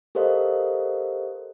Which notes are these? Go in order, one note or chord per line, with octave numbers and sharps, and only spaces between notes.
G4 A4 A#4 C5 D#5 F5